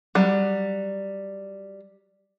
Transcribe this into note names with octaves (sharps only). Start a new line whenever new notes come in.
F#3 G3